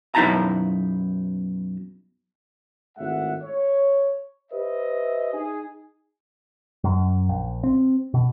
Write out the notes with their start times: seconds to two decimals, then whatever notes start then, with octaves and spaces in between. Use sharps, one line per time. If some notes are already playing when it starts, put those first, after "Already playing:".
0.15 F#2 B2 D#4 E4 A5 A#5
2.98 G#1 A2 G#3 E5 F#5
3.43 C#5
4.51 G4 B4 C5 D#5 E5
5.33 D#4 G#4
6.84 F#2
7.29 A#1
7.64 C4
8.14 B2